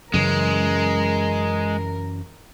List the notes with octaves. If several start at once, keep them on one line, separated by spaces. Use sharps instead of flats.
F#2 C#3 E3 G#3 A#4